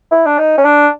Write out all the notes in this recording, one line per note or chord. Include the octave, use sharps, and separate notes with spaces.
E4
D4
D#4
C#4
D4